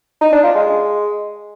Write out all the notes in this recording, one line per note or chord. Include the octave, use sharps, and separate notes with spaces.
D#4
D4
F4
G#3
G#3